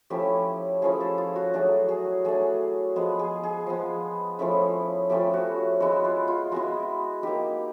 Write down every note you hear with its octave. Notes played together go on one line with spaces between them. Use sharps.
F3 A3 C#4 E4 G4
F3 A3 C#4 E4 G#4
A4
F4
F#4
F#3 A3 D4 G#4
G#4
F#3 A3 D4 G#4
F3 G#3 B3 G#4
G#4
G#4
F3 G#3 B3
F3 A3 C#4 E4
F3 A3 C#4 E4 G4
F#4
G#3 B3 E4 F#4
F4
F4
G#3 B3 E4 F#4
A#3 D#4 G4